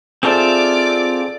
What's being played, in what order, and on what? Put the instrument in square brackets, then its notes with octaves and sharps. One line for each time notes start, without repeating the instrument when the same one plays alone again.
[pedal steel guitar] C4 F4 E5 [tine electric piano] G#4 A4 C5 [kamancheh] D5 D6